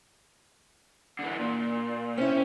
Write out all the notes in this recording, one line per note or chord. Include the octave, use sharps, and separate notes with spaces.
D3 E3
A#2
C4 C#4 E4